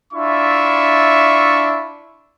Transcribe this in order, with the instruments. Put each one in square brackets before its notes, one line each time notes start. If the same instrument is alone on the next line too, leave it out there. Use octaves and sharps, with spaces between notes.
[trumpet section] D4 E4 F4 E5 C#6